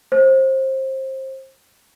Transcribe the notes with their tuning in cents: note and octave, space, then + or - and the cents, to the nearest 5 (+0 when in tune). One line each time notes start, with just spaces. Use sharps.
C5 +25